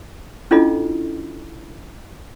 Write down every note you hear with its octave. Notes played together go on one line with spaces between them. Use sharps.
C#4 D4 E4 F4 A4 D#5